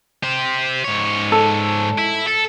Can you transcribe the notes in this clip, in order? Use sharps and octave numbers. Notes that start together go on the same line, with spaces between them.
G4 C5
G#2 C#5
A4
E4
A4